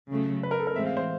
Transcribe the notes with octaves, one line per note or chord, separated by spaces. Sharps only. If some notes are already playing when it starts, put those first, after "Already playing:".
C#3 F#3 A3
B4
A#4
A4
A#4
A2 E3 G#3 C4 E5
F5
C5